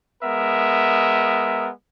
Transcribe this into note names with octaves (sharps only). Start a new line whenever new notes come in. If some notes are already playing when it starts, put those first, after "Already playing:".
G#3 B3 A#4 E5